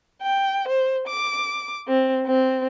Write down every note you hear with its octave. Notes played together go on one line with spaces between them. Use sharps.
G5
C5
D6
C4
C4